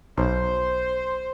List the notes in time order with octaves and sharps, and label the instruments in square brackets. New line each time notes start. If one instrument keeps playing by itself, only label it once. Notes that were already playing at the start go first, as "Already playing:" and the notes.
[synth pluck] B1 [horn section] C5